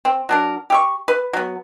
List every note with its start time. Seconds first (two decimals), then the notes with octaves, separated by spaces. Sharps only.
0.05 C4
0.29 F#3 D4 A#4
0.70 G4 E5 C#6
1.08 B4
1.33 F#3 B3